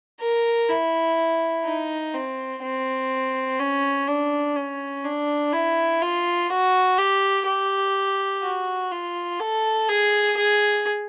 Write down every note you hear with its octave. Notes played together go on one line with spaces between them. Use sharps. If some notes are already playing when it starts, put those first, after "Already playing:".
A#4
E4
D#4
C4
C4
C#4
D4
C#4
D4
E4
F4
F#4
G4
G4
F#4
F4
A4
G#4
G#4